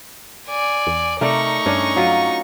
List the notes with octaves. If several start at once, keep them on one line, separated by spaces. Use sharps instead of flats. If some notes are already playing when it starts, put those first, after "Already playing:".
D5 G#5
E2
C3 A3 D#4 A#4 D5 C#6
G2 C#4 D4
F#3 F4